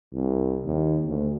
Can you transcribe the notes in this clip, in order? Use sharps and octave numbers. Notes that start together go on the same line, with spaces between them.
C2
D#2
D2